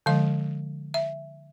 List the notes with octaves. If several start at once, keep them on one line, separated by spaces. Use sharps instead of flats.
D3 F3 G#3 F5
E5